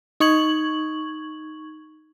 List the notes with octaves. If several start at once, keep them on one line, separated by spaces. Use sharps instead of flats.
D#4 C#6 G#6 F#7